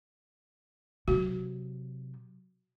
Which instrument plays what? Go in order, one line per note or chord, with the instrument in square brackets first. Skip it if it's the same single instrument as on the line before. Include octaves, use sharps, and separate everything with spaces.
[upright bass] C3 F#3 [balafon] F#4